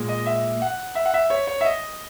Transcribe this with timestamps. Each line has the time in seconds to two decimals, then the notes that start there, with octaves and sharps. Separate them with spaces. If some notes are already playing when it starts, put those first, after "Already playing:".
Already playing: A#2 G#3
0.09 D#5
0.26 E5
0.62 F#5
0.95 E5
1.05 F#5
1.14 E5
1.30 C#5
1.47 C#5
1.61 E5
1.65 D#5